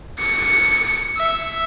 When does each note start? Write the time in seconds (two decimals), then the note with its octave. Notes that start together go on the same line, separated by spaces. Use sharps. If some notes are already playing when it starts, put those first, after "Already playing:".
0.19 C#7
1.17 E5